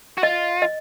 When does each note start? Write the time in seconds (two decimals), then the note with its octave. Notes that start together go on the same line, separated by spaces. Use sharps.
0.18 F#4
0.23 F4 D#5
0.62 D#5